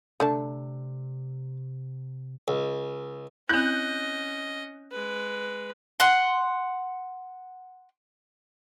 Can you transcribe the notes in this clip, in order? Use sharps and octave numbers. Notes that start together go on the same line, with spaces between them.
C3 A3 D4 A5
C#2
C4 C#4 E4 D#5 F#6 G6
G#3 B4
F#5 C6